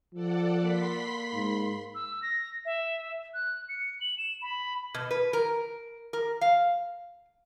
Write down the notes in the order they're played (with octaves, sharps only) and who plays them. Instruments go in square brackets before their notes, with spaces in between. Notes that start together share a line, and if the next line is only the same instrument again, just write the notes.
[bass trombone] F3 [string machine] A4 D5 F#5
[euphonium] A#3 [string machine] B5 C6 B6
[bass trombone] G#2
[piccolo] E6
A#6
E5
F#6
C#7
F#7
E7
B5
[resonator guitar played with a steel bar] B2
B4
A#4
A#4
F5